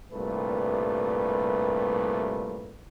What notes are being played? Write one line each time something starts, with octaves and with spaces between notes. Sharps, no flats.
C2 G2 A#2 A3 B4